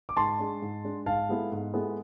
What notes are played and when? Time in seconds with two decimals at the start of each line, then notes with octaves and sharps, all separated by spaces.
0.09 D6
0.17 G#2 A5 C6
0.39 G#3 D4
0.62 G#2
0.84 G#3 D4
1.06 G#2 F5 A5
1.29 G#3 B3 E4 A4
1.52 G#2
1.74 G#3 B3 E4 A4